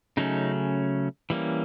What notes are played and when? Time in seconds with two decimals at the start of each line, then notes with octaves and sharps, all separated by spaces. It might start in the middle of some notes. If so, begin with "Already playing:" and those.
0.17 C#3 F#3 A3 C#4 D#4
1.30 E3 G3 A#3 C#4